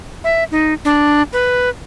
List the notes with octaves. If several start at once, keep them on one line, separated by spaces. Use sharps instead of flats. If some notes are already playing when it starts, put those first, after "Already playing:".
E5
D#4
D4
B4